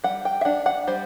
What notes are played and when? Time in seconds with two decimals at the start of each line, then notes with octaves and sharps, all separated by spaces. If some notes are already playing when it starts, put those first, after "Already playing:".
0.04 G3 F#5
0.25 G5
0.41 E5
0.45 D4 F#5
0.66 F#5
0.87 G3 C5